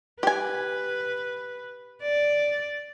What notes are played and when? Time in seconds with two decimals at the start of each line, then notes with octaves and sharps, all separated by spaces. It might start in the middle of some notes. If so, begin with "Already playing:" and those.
0.23 G4 B4 G#5
2.02 D5